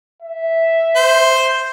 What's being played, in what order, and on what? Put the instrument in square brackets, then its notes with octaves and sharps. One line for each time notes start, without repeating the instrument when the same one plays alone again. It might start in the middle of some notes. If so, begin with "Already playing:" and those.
[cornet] E5
[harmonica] C5